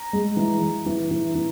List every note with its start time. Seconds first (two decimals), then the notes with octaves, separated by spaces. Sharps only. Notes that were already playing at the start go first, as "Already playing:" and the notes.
Already playing: A#5
0.13 G#3
0.37 E3
0.62 E3
0.86 E3
1.11 E3
1.35 E3